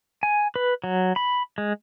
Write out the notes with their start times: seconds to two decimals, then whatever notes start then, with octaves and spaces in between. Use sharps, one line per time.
0.23 G#5
0.56 B4
0.84 F#3
1.16 B5
1.58 G#3